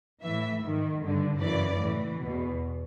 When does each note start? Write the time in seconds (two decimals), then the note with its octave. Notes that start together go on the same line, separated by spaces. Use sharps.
0.23 A2 E3 E5
0.62 G#2 D#3
1.02 G2 D3
1.41 F#2 C#3 E3 D5
1.80 A2 E3
2.20 E2 B2